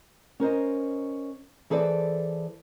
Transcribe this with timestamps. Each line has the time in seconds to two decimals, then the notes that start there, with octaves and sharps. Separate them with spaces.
0.40 C#4 A#4 C5 D#5
1.70 E3 G#4 A4 C5 D5